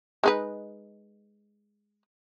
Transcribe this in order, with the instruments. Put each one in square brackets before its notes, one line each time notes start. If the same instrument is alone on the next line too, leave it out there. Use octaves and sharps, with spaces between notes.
[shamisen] G#3 D#4 B4